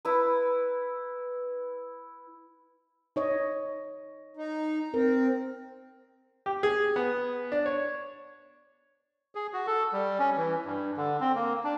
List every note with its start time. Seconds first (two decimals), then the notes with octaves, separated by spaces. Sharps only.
0.05 E4 B4
3.16 D#4 C#5 D#5
4.37 D#4
4.94 C4 A#4
6.46 G4
6.63 G#4
6.96 B3
7.52 D4
7.66 C#5
9.35 G#4
9.53 F#4
9.67 A4
9.93 G3
10.19 C#4
10.36 E3
10.65 G2
10.97 D3
11.20 C4
11.36 A#3
11.64 D4